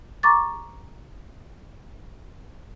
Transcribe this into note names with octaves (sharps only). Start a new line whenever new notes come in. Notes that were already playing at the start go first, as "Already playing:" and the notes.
A#5 C#6 D6 A6